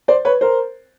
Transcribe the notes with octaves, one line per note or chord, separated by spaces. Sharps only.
C5 D5
B4 C#5
A#4 C5